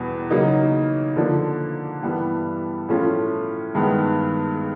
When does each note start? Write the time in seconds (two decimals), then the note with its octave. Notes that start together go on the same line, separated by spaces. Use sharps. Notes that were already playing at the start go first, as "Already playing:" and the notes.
Already playing: E2 B2 G3 B3
0.30 C#3 F#3 A#3 D#4
1.16 D3 F3 A#3 D4
2.02 G2 E3 G3 B3
2.89 A2 F3 A3 C#4 F4
3.75 G2 D#3 G#3 B3